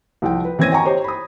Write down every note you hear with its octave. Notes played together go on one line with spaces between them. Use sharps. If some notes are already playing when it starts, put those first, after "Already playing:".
C2 F3 F4 G5
B4
E3 C4 C#4 G#6 A#6 D#7
D#5 G5 G#5 A#5 C#6
G4 C5 C#5
B5 D#6